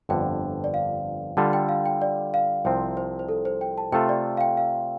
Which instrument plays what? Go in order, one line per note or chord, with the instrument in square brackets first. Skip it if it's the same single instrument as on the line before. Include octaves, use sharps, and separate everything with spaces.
[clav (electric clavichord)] G1 F2 D3 [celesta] G5
[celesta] D5
F5
[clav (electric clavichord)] D3 G3 F4 A4 [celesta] A5
[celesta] G5
F5
G5
D5
F5
[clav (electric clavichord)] C2 C3 F3 C4 [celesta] G5
[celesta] C5
C5
A4
C5
G5
A5
[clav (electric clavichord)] C3 A3 F4 A4 [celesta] G5
[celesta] D5
F5
G5
F5